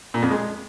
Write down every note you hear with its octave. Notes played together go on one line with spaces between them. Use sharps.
A#2
F2
G#3